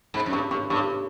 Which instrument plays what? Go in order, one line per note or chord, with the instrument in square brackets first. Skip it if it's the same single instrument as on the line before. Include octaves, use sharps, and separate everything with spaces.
[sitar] G#2 [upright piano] B5
[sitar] F#2
[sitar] G2 [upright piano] C#6
[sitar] G2 [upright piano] C#6
[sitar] G2 [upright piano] C#6